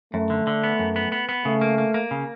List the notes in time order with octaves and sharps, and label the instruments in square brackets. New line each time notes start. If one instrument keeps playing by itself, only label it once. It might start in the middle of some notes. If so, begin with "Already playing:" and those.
[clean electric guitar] F#2 [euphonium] A3
[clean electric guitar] D3
D3
B3
F#2
B3
B3
B3
[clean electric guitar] C#3 [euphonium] A3
[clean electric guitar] A#3
A#3
A#3
C#3